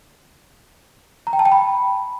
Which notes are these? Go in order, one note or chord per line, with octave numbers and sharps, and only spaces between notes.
A#5
G5
A5
G5
B5